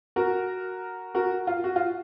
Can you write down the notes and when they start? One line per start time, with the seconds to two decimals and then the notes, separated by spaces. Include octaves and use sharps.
0.16 F#4 A#4
1.15 F#4 A#4
1.47 F4
1.64 F#4
1.76 F4